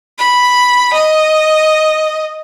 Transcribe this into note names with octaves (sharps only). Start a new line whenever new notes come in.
B5
D#5